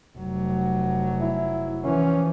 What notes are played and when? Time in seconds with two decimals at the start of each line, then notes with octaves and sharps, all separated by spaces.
0.19 F1 F#3
1.20 E4
1.84 E3 F3 C#4